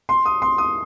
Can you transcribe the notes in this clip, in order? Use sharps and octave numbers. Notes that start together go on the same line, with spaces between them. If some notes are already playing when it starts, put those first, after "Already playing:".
C6
D#6
C6
D#6